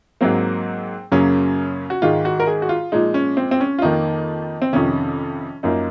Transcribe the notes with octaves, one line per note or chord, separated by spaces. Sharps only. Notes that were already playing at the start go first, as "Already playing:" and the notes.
G#2 F#3 A#3 C4
F#2 C#3 F#3 A#3 C#4
F#4
G#2 D#3 G#3 F4
F#4
A#4
G#4
F#4
F4
A#2 F3 G#3 D#4
C#4
C4
C4
C#4
F4
F2 D#3 A#3 D#4
C4
F2 C3 D#3 C#4
F#2 F3 A#3 D#4